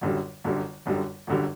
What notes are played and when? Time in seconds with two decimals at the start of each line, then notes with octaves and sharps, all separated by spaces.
0.01 G1 F#2 D3 G3
0.44 G1 F#2 D3 G3
0.86 G1 F#2 D3 G3
1.27 G1 F#2 D3 G3